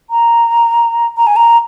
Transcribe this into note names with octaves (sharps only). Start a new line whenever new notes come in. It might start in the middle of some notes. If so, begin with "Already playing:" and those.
A#5
A#5
G#5
A#5